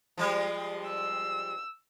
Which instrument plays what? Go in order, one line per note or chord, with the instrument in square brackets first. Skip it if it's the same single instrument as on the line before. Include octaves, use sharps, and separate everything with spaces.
[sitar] F3 G3 G#3
[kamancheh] E6